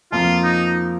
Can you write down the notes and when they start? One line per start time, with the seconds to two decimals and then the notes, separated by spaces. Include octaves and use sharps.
0.12 F2 F3 A#3 F4
0.43 D#4